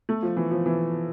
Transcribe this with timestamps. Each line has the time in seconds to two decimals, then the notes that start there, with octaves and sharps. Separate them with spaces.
0.09 A3
0.23 F3
0.37 E3
0.51 F3
0.66 E3